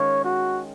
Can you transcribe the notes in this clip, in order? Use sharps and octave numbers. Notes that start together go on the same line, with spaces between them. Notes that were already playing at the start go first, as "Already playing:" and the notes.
Already playing: D#3 G#3 C#4 F4 C#5
F#4